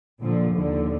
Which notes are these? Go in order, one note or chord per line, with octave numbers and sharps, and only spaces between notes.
A#2 D3 F3
D#2 D3 F3